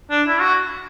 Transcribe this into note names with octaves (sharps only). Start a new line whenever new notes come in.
D4
E4
F#4